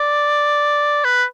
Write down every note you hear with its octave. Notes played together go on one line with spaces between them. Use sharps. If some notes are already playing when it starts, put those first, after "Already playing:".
Already playing: D5
B4